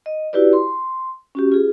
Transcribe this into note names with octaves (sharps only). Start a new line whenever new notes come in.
D#5
E4 F#4 G4 B4 D5
C6
C#4 F#4 G4
F4 G#4